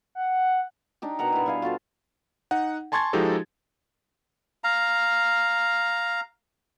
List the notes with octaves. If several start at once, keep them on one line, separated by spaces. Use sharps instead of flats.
F#5
D4 D#4 G4
B2 A#4 F#5 A#5
B3 E4
G3 F5 G#5
F4 F#4 A4 C5
D#4 F#5
G#5 A5 C6 C#6 G#6 A6
F3 G#3 D#4 F#4 G4 A4
F5 A#5